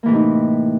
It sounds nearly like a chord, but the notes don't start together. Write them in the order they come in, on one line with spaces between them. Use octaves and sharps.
A#3 E3 A2 C3 D#4